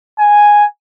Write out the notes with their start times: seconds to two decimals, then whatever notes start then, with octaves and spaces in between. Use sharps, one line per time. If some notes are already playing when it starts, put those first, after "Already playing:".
0.19 G#5